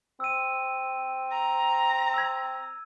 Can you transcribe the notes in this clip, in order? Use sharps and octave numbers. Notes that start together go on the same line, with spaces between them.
C4 E6 D#7
A#5
E6 G#6